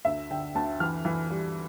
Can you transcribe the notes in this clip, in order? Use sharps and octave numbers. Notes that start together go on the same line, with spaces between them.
D2 E5
D3 G5
D2 A5
E3 F6
E3
G3